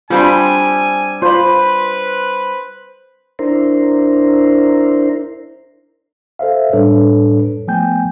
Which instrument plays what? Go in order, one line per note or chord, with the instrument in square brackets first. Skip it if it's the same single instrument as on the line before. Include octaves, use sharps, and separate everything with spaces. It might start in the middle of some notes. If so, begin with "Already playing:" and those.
[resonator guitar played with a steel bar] G3 C4 D4 [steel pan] F4 G4 B5 [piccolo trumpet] G#5
[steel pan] F4 D5 [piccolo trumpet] B4 [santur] C5 B5
[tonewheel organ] D4 E4 A#4 C5
[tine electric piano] A4 C5 E5 F5
A2 G3 D4 A4 B4 C#5
F3 A3 B3 G5 G#5 G6